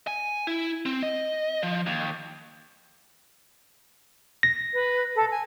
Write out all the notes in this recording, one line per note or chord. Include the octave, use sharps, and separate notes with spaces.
G#5
E4
C4
D#5
F3
D#2
A#6
B4
A4
G#5